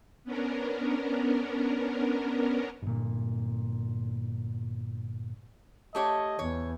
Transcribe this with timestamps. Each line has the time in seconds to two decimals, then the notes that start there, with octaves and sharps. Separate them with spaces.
0.24 B3 C#4 D4 A#4
2.82 G1 A#2
5.95 A3 G4 C#5 D#5
6.39 E2 C#5